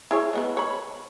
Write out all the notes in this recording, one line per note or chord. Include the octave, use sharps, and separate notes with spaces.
E4 G#4 C#5
G#3 B3 B4
C#5 B5